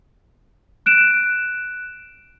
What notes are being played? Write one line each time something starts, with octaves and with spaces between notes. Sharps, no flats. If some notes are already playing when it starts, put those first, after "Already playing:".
F#6 D7 E7